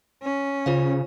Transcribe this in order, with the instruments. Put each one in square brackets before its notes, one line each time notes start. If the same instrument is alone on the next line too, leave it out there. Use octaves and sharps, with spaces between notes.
[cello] C#4
[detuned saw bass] C#3 [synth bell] F4 C5 F5